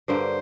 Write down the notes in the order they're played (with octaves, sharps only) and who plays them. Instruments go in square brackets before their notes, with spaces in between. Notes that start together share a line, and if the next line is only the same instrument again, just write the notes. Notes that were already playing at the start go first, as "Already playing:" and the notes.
[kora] G2 D3 G3 A#3 [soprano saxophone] C5